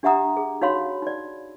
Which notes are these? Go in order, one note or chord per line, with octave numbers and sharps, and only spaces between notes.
D4 G4 E5 F#5 A#5 D#6
G#4
D#4 F#4 C#5 F5 B5 C6
D#4 D5